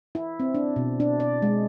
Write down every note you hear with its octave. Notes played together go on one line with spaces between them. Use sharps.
E4
C4
D4
B2
D4
D5
G#3